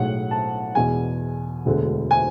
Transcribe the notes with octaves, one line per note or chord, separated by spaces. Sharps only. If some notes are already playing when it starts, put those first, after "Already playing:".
Already playing: B1 A2 G#3 F#5
A5
E2 B2 G#3 G#5
E1 D2 D3 G#3
G#5